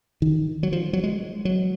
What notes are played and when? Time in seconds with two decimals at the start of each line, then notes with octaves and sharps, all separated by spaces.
0.22 D#3
0.63 F#3
0.72 F3
0.93 F#3
1.03 G#3
1.45 F#3